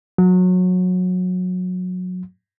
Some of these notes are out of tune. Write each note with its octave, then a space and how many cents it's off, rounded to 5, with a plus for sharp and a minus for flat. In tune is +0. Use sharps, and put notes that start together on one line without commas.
F#3 -25